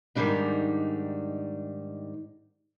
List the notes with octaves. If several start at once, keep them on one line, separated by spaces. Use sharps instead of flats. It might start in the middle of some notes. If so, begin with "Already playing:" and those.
G#2 D#3 E3 G3 D4 D#4